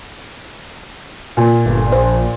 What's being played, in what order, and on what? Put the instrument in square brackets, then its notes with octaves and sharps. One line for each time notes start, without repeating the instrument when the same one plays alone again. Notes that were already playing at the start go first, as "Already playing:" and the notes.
[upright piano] A#2
[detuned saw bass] G1
[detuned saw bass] A#1 [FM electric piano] C5